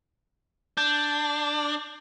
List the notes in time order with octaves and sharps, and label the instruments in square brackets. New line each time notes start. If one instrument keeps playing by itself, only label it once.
[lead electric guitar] D4 [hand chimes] G6